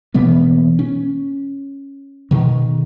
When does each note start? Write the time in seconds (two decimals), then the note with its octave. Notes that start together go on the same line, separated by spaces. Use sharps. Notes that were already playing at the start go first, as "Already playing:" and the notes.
0.14 B2 E3 A#3 B3
0.79 C#4
2.31 B2 D#3